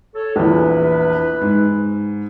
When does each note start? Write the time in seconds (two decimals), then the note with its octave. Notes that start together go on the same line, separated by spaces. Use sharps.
0.15 A4 C#5
0.36 A#1 E2 B4
1.41 G#2